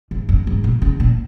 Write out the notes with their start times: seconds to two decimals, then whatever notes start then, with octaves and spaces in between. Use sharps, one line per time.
0.11 G#2
0.29 F#2
0.47 G#2
0.64 A#2
0.82 C#3
1.00 A#2